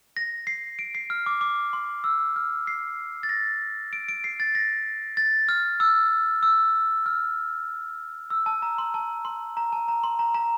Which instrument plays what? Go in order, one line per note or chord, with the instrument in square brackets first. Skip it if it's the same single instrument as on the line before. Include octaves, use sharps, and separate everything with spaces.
[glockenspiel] A#6
C7
D7
C7
F6
D6
D6
C6
E6
F6
C7
A6
A#6
D7
D7
C7
A6
A#6
A6
F6
E6
E6
F6
E6
A5
A#5
C6
A5
C6
A#5
A5
A#5
C6
A#5
A#5